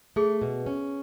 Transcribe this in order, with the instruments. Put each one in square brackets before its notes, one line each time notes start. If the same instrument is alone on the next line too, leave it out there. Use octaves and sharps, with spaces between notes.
[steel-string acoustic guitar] A3 [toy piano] G#4
[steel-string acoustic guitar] B2
C#4